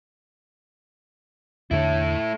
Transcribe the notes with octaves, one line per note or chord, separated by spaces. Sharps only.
E2 D3 A3 D4 E4